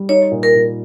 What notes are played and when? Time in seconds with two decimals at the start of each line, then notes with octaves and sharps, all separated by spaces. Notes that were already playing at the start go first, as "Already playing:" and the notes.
Already playing: G3
0.09 D#4 C#5
0.31 A#2
0.43 A#4
0.55 A#2